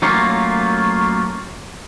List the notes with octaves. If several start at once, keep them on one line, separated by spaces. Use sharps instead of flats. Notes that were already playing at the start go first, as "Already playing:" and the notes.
F#3 A3 A#3 C#4 F4